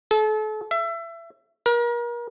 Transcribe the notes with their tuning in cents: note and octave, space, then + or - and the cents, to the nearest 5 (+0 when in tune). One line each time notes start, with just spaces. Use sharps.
A4 -35
E5 +25
A#4 +35